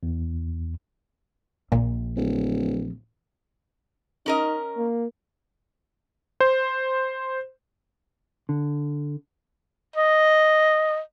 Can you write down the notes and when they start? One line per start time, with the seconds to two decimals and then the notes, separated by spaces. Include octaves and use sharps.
0.03 E2
1.72 A#1 A#2
2.17 D1
4.26 C#4 D#4 A#4 D#5
4.77 A#3
6.40 C5
8.49 D3
9.96 D#5